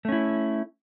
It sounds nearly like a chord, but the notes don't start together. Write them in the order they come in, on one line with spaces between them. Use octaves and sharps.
A3 C#4 E4